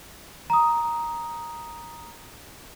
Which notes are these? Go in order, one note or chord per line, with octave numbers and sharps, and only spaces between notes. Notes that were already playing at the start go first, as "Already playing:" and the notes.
A#5 D#6